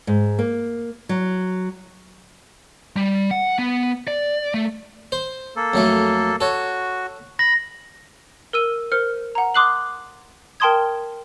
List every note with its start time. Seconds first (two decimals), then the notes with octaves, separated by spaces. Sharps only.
0.07 G#2
0.39 A#3
1.09 F#3
2.96 G3
3.31 F#5
3.59 B3
4.08 D5
4.54 A3
5.12 C5
5.56 A#3 A4
5.74 F2 F#3 A3
6.41 F#4 A4 C#5
7.39 B5 A#6
8.53 A#4 E6 D#7
8.92 A#4 C5 F6 C#7
9.35 F#5 A#5
9.54 C6 D6 D#6 F#6 C7 F#7
10.60 A#4 G5 A5 C6 D#6 G#6